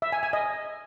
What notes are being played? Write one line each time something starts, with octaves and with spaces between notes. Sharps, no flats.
E5
G#5
G#5
D#5